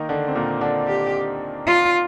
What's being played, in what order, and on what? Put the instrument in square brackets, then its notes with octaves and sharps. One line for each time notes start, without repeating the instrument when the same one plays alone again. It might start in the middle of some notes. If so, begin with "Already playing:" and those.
Already playing: [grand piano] D#3 A#3 D#4 A#4
D3 D4
C4
A#2 A#3
D3 D4
[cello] G4
F4